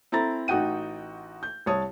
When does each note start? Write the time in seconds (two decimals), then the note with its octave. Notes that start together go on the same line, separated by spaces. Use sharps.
0.12 C4 E4 A4 A#5 A6
0.48 A1 D#4 F#4 F#5 G5 D#7
1.43 G6
1.66 C2 C#5 A5 D#6